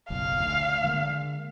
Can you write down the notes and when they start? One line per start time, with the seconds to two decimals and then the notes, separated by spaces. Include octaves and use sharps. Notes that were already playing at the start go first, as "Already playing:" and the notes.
0.10 F#1 B1 F5
0.40 D2
0.84 D3 G#3 A#3